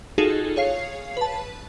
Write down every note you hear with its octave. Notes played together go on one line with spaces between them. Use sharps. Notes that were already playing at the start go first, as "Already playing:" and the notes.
D#4 F4 F#4 G#4 A4
G#4 C#5 F5 C7
B4 A5